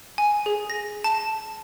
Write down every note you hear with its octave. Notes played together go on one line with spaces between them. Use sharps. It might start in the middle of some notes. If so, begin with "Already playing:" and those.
G#5
G#4
A#6
A5